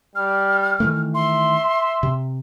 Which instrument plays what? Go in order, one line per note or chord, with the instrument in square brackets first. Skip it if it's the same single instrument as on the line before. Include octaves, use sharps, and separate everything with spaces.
[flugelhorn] G3 [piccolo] F6
[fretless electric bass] D#3 E3 A3
[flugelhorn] E5 [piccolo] C6
[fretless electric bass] C3